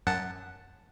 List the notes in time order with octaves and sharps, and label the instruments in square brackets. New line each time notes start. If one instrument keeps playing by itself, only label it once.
[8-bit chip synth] F#2 F#5 A5